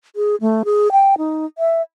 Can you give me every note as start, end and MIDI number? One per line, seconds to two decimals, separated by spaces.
0.16 0.35 68
0.41 0.63 57
0.65 0.91 68
0.92 1.15 79
1.18 1.46 63
1.58 1.82 76